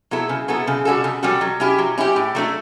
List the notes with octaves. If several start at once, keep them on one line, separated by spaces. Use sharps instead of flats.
F#3 B3 E4 A4
C#3
F#3 B3 E4 A4
C#3
G3 C#4 F#4 A4
C#3
G3 C#4 F#4 A4
F#3
C#4 E4 G4
F#3
C#4 E4 G4
A2
F#3 A3 D4